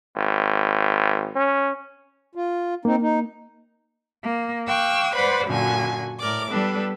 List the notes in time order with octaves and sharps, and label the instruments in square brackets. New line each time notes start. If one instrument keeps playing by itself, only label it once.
[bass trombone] G#1
C#4
[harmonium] F4
[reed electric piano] A#3 [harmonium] C4 D#4
[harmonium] D#4
[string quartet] A#3
F5 G5 C#6 D6 E6 F#6
B4 C5 D5 F#5 B5
F#2 A#2 D3 F#4 G#5
A2 A#4 D5 D6
G3 B3 D4 A4 B4